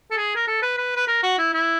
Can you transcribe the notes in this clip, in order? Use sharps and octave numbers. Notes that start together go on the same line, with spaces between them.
A4
G#4
A#4
A4
B4
B4
B4
A#4
F#4
E4
E4